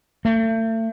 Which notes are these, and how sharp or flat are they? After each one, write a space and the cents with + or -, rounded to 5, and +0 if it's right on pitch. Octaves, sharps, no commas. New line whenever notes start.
A3 +35